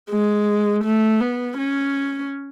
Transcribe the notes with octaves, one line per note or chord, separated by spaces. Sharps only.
G#3
A3
B3
C#4